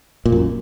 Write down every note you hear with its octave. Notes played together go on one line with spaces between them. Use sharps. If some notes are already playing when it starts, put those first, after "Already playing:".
A#2
F2
F#2